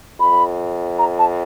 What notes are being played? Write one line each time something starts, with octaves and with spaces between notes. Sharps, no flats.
F2 B5
A#5
A5